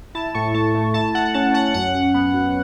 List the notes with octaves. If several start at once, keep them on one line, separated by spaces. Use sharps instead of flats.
E4 A5
A2 C#6
A3 A5
A3
E4 A5
E4 F#5
C#4 A5
C#4 F#5
F#2 F#5
F#2
B3
F#2